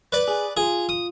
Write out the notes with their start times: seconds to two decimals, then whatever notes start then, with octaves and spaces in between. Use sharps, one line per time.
0.12 B4 D5
0.28 G#4
0.57 F4 G#4
0.89 D#6